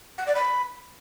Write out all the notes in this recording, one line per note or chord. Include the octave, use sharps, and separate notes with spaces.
F#5
D5
B5